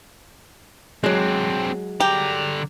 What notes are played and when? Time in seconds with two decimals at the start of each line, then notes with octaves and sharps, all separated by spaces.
1.04 F#3 G#3 C4 D4
2.00 D3 G4 A#5